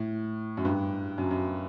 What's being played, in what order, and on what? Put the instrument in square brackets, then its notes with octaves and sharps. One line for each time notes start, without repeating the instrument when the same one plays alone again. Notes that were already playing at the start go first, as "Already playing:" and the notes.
Already playing: [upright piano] A2
F#2
G2
F#2
F#2